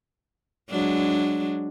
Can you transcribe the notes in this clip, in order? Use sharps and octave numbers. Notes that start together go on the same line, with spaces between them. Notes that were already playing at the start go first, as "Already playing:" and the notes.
F#3 G#3 D4